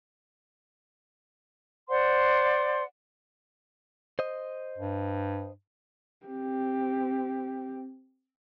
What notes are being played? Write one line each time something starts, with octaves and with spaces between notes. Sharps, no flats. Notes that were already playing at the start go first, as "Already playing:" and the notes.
C5 D5 F#5 C6
C5 D#5
G2
C4 G4